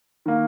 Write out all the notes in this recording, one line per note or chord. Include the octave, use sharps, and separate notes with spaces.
D#3 A#3